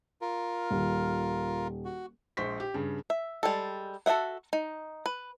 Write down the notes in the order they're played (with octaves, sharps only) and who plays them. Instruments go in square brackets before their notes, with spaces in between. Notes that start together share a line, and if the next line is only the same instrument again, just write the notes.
[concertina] F4 A#4
[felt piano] D#1
[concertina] F#4
[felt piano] A#1 G#3 C5 C#6 B6
G4
G2 C#3
[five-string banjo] E5
G3 G#3 A4
F#4 A4 D#5 E5 F#5
D#4
B4